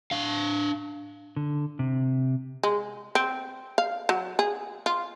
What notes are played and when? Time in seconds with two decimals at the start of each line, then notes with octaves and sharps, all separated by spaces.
0.11 D4 F5
1.36 D3
1.79 C3
2.63 G#3
3.15 C4
3.78 F5
4.09 F#3
4.39 G#4
4.86 F4